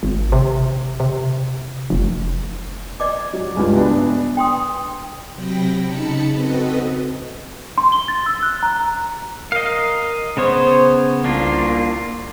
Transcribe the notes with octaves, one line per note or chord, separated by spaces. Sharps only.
G#1
C3
C3
F1
D5 D#5 D6
F#3
C#2 G2 G#3
B3 D4 E5
G5 C6 D#6
C3 F#3 G5 B5 A#6
C#3 D#4 A5 B5 C#7
C4 F#4 A4 B4 D#5
C6
G7
A6
E6
F#6
A#5
A#4 D#5 F5
C#3 B3 C5 C#5
C2 A#3 D4 F4